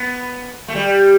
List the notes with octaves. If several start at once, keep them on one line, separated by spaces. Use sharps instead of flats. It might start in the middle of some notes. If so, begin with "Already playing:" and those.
Already playing: B3
A3
G3